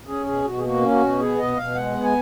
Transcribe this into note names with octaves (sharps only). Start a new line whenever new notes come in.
C#4 G#4
B2 G#4
B2 F#4
G#4
A#3 F#4
C#4
F#4
B2
B3 G#4
B2 D#5
B2 F5
G#3 F#5
B3
G#5